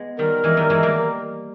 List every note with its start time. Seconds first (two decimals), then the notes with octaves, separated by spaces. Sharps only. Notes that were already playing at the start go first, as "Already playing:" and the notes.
Already playing: G#3 B3
0.18 D#3 G3 A#4
0.44 E3 G#3
0.57 D#3 G3
0.70 E3 G#3
0.83 G3 A#3